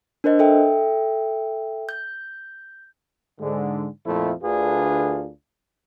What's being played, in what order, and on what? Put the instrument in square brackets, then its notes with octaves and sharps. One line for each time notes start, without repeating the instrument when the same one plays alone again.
[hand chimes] D4 A#4 C5 D#5
A4 E5 G5
G6
[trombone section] G#2 D3 G#3
F2 A#2 F3 A3 C4 E4
D2 D3 D4 F4 G#4 B4